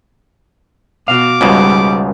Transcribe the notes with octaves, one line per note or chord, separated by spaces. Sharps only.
B2 F#4 F5 D6
C#2 G#2 B2 G3